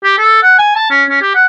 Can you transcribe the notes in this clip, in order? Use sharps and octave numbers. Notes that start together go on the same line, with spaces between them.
G4
A4
F#5
G#5
A5
C#4
C#4
G4
F#5